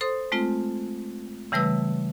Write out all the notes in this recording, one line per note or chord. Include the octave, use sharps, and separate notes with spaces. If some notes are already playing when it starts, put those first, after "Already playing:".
A4 C5 C6 D#6
G#3 A3 C4 F4
C#3 E3 G3 A3 B4 E6